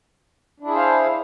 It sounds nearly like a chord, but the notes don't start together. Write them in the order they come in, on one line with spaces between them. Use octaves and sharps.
D4 E4 G#4 C5 F5